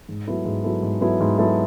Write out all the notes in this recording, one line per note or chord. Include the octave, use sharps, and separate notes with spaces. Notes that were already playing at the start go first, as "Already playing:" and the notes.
G#2
F#3 B3 E4 A4
G#2
F#3 B3 E4 A4
G#2
F#3 B3 E4 A4
G#2
F#3 B3 E4 A4